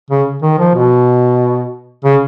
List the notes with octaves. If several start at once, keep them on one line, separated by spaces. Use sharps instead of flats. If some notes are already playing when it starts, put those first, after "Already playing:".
C#3
D#3
F3
B2
C#3